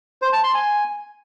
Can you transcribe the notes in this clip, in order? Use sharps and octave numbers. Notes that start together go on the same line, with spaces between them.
C5
A5
C6
G#5